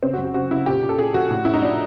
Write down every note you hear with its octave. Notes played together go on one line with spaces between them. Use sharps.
C#3 C4
F#4
F#2
F#4
C#3 F#4
C#3 E4
A#2 G4
A#2
A4
A#2 G#4
F3 F#4
A2
A2 E4
D#4
F3 D4